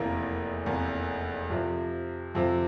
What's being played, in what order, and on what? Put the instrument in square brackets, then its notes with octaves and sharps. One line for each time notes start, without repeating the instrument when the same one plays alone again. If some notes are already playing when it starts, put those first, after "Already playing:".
Already playing: [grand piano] F1 E2 E3 A#3
F1 E2 E3 A#3
F2 C3 F3
F2 C3 F3